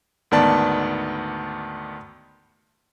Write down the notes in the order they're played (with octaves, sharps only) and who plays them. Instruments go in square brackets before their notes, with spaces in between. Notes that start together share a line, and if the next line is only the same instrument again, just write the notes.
[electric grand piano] D2 G#2 D#3 B3 D5 A5